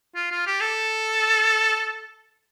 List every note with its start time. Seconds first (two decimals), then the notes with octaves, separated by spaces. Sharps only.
0.16 F4
0.32 F4
0.47 G4
0.61 A4